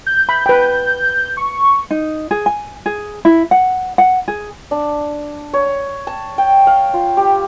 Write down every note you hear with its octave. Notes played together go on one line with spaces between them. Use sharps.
G6
B5
B4 G5
C#6
D#4
G#4
G#5
G#4
E4
F#5
F#5
G#4
D4
C#5
A5
G5
F5
F4
G4